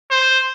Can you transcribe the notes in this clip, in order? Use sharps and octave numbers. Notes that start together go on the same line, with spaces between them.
C5